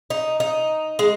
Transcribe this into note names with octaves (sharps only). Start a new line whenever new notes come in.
D#4
D#4
G#3